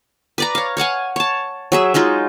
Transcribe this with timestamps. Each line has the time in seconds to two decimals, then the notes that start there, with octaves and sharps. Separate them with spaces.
0.38 B4 D5 A#5
0.55 C#5 F5
0.77 C#5 F5 F#5 G#5
1.16 C#5 A5
1.72 F#3 G#4 E5
1.94 F#3 G#3 D#4 F4